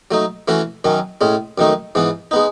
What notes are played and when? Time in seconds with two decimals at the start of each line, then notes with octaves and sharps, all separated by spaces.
0.11 F#3 A3 D#4
0.48 E3 A3 C#4 F#4
0.84 F#2 D#3 F#3 C#4
1.21 A2 G#3 C#4
1.58 F#2 D#3 A3 D#4
1.95 G#2 E3 B3
2.31 G#3 B3 D#4